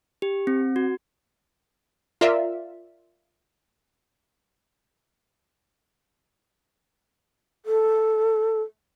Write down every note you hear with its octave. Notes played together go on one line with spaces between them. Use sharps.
G4
C4
F#4
F4 A#4 D5 E5
A4